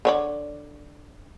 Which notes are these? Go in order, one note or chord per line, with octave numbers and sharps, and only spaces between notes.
D3 C#5 D5